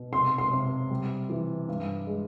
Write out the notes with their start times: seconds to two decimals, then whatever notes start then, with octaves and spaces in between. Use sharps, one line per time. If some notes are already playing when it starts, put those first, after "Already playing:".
Already playing: B2
0.12 C3 C6
0.38 C6
0.51 C3
0.90 G3
1.29 E3
1.69 G2
2.07 G#3